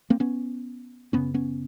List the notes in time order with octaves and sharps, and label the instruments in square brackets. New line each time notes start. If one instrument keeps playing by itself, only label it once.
[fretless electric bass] A#3 C4
B3 C#4
F#2 C#3 B3 C#4
B3 C#4